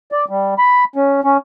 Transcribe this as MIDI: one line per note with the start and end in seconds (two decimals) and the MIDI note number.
0.12 0.25 74
0.29 0.54 55
0.58 0.84 83
0.96 1.21 61
1.24 1.37 61